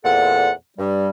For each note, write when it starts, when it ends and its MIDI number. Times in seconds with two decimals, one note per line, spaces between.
0.04 0.51 40
0.04 0.51 46
0.04 0.51 60
0.04 0.51 69
0.04 0.51 78
0.78 1.09 43
0.78 1.09 55